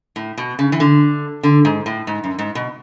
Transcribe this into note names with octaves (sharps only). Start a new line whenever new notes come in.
A2
B2
C#3
E3
D3
D3
G#2
A2
G#2
F#2
G#2
B2